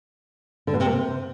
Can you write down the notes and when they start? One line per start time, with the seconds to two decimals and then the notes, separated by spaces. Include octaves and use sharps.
0.67 D3
0.74 B2
0.80 C3
0.86 A#3
0.93 C3